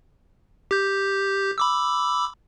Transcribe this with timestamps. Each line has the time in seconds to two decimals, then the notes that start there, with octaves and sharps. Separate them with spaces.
0.71 G4 G6
1.58 B5 D6 E6